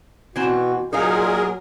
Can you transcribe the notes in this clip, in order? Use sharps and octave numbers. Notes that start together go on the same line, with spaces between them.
B2 E3 C4 F#4 A5
A#2 F#3 D#4 G#4 A#4 D#5 F5